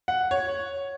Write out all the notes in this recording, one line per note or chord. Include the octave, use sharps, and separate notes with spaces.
F#5
C#5